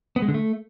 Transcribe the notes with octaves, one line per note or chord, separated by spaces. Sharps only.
B3
G#3
D3
A3